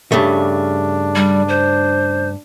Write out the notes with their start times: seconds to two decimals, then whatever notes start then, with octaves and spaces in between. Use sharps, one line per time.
0.12 G2 C#3 A3 D4
1.16 G3
1.49 C5